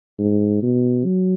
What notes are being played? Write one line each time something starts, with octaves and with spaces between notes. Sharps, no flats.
G#2
B2
F#3